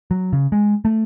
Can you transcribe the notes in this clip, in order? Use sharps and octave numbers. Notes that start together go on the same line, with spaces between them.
F#3
C#3
G#3
A3